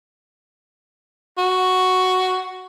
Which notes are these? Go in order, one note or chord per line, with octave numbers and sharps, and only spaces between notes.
F#4